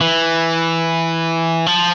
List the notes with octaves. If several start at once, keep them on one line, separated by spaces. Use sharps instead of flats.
E3
F3